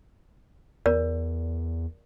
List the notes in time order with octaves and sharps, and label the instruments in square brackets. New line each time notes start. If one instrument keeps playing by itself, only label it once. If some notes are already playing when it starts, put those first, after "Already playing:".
[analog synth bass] E2 [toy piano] A#4 D5